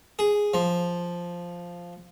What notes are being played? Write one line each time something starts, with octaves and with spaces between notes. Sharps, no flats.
G#4
F3